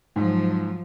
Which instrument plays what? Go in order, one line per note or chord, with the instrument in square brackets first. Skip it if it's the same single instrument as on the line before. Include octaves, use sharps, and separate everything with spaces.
[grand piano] G#2 [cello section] F3 F#3